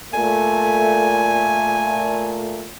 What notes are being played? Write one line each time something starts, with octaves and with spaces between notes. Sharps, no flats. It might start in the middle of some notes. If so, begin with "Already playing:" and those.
A#2 A3 G#5